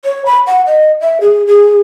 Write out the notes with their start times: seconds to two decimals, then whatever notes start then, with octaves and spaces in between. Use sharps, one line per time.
0.05 C#5
0.26 B5
0.47 F#5
0.66 D#5
1.01 E5
1.21 G#4
1.47 G#4